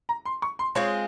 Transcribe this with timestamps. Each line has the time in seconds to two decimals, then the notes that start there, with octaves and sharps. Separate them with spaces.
0.09 A#5
0.25 C6
0.42 C#6
0.59 C6
0.75 G#3 C4 F4 G#4 C#5